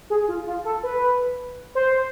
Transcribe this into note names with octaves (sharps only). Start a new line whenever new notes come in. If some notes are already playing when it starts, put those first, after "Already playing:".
G#4
F4
F4
A4
B4
C5